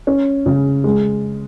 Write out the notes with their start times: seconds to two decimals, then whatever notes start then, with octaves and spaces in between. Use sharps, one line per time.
0.07 C#4
0.46 C#3
0.84 G#3